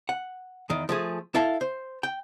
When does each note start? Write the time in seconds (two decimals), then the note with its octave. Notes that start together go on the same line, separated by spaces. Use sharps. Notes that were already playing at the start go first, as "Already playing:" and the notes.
0.09 F#5
0.70 E2 D#3
0.89 F3 A3 G#4
1.35 E4 A4 F5 A5
1.61 C5
2.03 G5